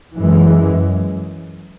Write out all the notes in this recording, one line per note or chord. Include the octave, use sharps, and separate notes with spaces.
F#2 E3 G#3